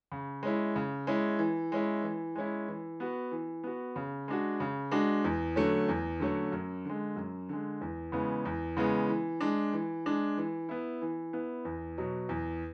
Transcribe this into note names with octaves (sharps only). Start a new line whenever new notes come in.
C#3
G#3 C#4 E4
C#3
G#3 C#4 E4
E3
G#3 C#4 E4
E3
G#3 C#4 E4
E3
B3 F#4
E3
B3 F#4
C#3
G#3 D4 F#4
C#3
G#3 D4 F#4
E2
D3 F#3 A3 C#4
E2
D3 F#3 A3 C#4
F#2
D3 G#3
F#2
D3 G#3
E2
C#3 E3 G#3 B3
E2
C#3 E3 G#3 B3
E3
G#3 D4
E3
G#3 D4
E3
B3 E4
E3
B3 E4
E2
B2 F#3
E2